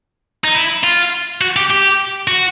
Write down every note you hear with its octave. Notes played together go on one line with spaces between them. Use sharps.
D#4
E4
F4
F#4
G4
G4
F#4